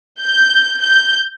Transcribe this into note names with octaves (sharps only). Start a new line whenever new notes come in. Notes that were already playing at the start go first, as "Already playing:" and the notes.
G6
G6